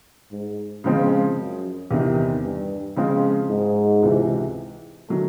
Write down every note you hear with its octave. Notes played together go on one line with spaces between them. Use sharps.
G#2
C#3 F3 G#3 C4
F#2
E2 C3 D#3
G2
C#3 F3 G#3 C4
G#2
C#2 C3 E3
D#3 F#3 A3